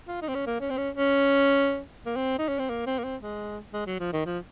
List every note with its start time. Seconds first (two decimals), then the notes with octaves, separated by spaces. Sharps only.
0.08 F4
0.22 D#4
0.29 C4
0.35 C#4
0.47 A#3
0.60 C#4
0.70 C4
0.78 C#4
0.95 C#4
2.06 A#3
2.16 C4
2.39 D#4
2.48 C#4
2.59 C4
2.70 A#3
2.86 C4
2.99 A#3
3.04 C4
3.22 G#3
3.73 G#3
3.86 F#3
4.00 F3
4.13 D#3
4.26 F3